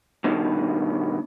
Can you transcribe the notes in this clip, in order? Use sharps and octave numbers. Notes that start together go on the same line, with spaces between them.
G2 B2 D#3